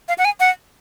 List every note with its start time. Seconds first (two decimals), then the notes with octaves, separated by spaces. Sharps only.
0.08 F5
0.18 F#5
0.25 G#5
0.40 F#5